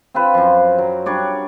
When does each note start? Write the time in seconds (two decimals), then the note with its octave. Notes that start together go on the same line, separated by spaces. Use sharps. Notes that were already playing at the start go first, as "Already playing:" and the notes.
0.14 C4 F4 B4 C5
0.34 F#2 F3
0.78 F#3 A#4
1.06 G3 D4 C#5 D5